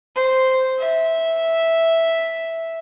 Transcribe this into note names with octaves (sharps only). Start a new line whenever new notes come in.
C5
E5